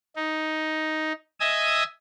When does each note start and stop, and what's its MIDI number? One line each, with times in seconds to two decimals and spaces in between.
0.16 1.13 63
1.40 1.83 75
1.40 1.83 76
1.40 1.83 80
1.40 1.83 87
1.40 1.83 88